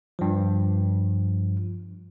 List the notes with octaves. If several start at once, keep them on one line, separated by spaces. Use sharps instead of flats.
G2 F3